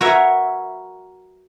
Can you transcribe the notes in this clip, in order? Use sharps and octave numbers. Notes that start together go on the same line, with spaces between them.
F#4 A#4 B4 C#5 E5